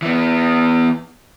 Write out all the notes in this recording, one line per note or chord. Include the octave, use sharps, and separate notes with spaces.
E3 B3